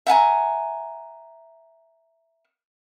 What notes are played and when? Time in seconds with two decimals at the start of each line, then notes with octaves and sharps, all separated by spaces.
0.07 E5 F#5 G#5 A#5